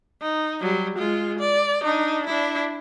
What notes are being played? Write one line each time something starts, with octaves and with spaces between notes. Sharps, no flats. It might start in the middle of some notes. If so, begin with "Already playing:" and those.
D#4
F#3 G3
G#3 F4
D5
D4 D#4
D4 E4